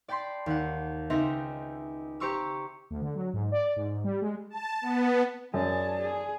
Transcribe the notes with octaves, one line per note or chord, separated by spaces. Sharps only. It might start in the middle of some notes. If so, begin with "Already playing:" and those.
D5 G5 A5 B5 C6
D#2 F#5
C#2 C4 D#4 E5 G5 A#6
G4 C5 A#5 C#6 D6 E6
D2
D3
F#3
G#2
D5
G#2
G3
G#3
A5
B3
F#2 G#4 D5 A5
G#4